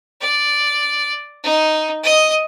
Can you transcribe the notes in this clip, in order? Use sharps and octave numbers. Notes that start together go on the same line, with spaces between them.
D5
D#4
D#5 D#6